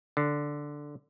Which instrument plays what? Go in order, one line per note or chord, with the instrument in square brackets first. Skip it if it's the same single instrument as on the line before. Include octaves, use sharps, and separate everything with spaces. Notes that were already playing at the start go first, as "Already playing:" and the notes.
[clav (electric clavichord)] D3